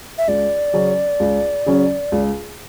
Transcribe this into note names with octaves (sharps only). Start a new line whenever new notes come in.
E5
C#2 D5
C#3 F#3 C#4
C#2
C#3 F#3 C#4
C#2